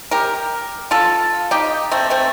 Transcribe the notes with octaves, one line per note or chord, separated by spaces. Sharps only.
G4 A#4
F4 A4
D#4 G4
A3 C4
A3 C4